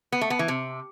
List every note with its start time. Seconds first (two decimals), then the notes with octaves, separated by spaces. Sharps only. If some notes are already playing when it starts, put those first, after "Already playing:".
0.12 B3
0.21 A3
0.30 B3
0.39 E3
0.48 C3